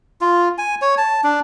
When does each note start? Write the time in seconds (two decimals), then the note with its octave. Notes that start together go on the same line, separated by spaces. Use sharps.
0.21 F4
0.58 G#5
0.82 C#5
0.98 A5
1.24 D4